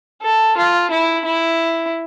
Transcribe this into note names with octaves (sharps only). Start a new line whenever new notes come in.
A4
F4
E4
E4